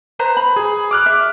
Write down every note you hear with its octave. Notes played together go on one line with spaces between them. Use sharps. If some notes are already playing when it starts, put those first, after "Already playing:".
B4 C5 A#5
B5
G#4
D6 F6 F#6
E5